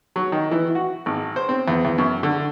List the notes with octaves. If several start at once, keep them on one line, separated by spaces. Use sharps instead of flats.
F#3
D#3
E3
F#4
G#1
C5
C4
E2
E2
F#2
D3